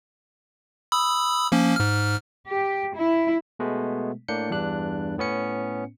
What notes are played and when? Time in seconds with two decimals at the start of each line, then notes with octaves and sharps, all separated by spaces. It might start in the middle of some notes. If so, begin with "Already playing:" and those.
0.92 B5 D#6 E6
1.52 F3 A#3 C#4
1.76 G#2 F6
2.48 G4
2.96 E4
3.59 B2 G#3 A3 B3
4.28 A2 A#3 D4 G6 C#7
4.50 E2 G2 D4 F#6
5.18 A2 B3 C#4 C#7